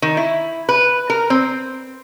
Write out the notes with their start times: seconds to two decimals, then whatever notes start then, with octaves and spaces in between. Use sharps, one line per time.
0.02 D#3
0.17 E4
0.69 B4
1.10 A#4
1.30 C4